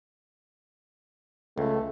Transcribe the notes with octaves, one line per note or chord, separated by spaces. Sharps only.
C#2 A3